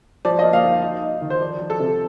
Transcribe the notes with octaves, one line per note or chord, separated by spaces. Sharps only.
F3 D5
A#3 D#5
F5
D#4
D#4
D#4
D#3
C5
F3 D5
F3
A4
C3